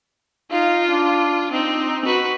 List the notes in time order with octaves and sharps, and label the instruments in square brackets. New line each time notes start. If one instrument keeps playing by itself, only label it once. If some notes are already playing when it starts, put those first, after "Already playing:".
[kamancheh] D#4 F5 [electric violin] F4
[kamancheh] D4
[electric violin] C4 [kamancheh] D#4
[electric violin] F#4 B4